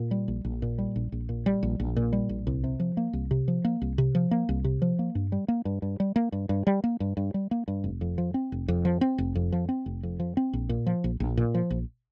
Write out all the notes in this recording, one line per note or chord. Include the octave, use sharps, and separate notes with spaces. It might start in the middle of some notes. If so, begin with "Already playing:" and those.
Already playing: A#2
G3
A#1
A#1
A#2
G3
A#1
A#1
A#2
G3
A#1
A#1
A#2
G3
A#1
C2
C3
F3
A#3
C2
C3
F3
A#3
C2
C3
F3
A#3
C2
C3
F3
A#3
G2
G3
A#3
G2
G2
G3
A#3
G2
G2
G3
A#3
G2
G2
G3
A#3
G2
F1
F2
F3
C4
F1
F2
F3
C4
F1
F2
F3
C4
F1
F2
F3
C4
A#1
A#2
F3
A#1
A#1
A#2
F3
A#1